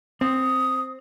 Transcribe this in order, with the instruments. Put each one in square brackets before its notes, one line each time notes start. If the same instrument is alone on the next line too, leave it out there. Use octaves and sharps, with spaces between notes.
[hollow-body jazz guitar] C4 [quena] D#6